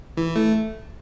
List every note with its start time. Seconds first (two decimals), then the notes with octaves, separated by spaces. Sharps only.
0.17 E3
0.36 A3